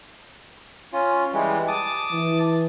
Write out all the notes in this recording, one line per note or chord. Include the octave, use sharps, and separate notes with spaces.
C#4 F4
E3 G3 G#3
A5 D6 D#6
E3